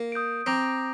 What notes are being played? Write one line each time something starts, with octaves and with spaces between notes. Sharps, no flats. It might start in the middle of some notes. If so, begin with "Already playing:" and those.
Already playing: A#3
D#6 G6 D7
C4 A#5 D6 G6 A#6 F7